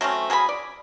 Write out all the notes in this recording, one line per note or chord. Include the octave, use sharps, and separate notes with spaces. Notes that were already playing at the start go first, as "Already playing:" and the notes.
F#3 A3 C4 C#4
F#3 G#4 A4 B5
D5